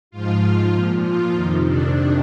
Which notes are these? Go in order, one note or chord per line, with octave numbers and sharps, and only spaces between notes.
G#2 F3 F4
A#2 F3
F4
F2 C3 D#3 D#4
D4